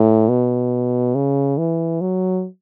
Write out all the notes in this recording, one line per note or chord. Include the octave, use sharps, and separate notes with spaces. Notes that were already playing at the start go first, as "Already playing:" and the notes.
Already playing: A2
B2
C#3
E3
F#3